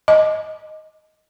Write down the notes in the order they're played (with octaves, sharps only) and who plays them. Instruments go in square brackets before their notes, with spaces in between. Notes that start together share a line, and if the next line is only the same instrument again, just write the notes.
[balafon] D#5